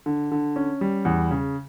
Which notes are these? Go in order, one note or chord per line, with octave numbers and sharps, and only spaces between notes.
D3
D3
C#4
G3
E2
C#3